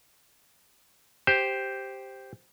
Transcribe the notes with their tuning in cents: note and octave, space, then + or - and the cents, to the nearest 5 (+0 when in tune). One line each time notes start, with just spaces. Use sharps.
G4 +0 C5 +0